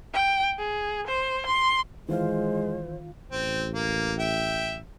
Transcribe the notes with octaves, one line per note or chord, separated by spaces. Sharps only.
G5
G#4
C5
C6
D#3 E3 G#3 F4 C5 F5
A1 C4
A#3
E5 G5